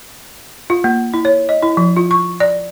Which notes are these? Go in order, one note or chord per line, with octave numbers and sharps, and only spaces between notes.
F4
A#3
E4
C#5
D#5
E4
F3
F4
C#6
D5